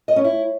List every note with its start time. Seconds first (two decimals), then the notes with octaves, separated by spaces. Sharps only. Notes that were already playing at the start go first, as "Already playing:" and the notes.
0.08 D#5
0.16 C#4
0.24 E4